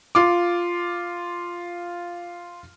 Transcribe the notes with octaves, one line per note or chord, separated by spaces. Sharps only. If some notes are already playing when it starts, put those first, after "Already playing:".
F4 D6